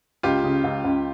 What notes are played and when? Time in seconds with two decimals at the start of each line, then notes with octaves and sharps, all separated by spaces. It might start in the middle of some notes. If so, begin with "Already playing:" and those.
0.23 C#2 F4 G4
0.44 C#3
0.64 C#2
0.84 C#2